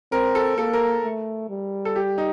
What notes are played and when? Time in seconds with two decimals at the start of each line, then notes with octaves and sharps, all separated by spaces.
0.12 C4 A#4
0.35 A4
0.57 A#3 A4
0.73 A#4
1.03 A3
1.49 G3
1.85 A4
1.96 G4
2.18 D#4